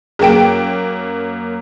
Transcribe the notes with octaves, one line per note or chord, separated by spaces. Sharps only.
F#2 A#3 G#4 G5 D7